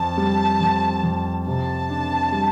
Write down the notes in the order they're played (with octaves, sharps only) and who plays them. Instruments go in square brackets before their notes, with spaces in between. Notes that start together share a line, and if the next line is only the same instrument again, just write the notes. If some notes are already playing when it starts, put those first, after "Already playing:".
Already playing: [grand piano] F2 [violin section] A5
[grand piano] G3
F2
F2
[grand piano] C3 [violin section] A5
[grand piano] D4
G3